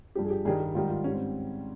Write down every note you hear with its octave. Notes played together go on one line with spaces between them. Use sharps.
G2 F3 G4
G#4
G4
G2 D#3 G3 G#4
G4
G#2 D#3 G3 F4
F4
G#2 G3 C#4
C4